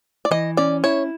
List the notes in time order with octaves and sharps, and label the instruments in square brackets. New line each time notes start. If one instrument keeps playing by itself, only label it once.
[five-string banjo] D5
[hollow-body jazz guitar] E3 [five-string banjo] D#5
[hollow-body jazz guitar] C#4 [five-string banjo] D5
[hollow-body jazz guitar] E4 [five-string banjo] C#5